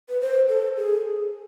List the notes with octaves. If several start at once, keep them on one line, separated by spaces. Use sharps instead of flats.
B4
C5
A4
G#4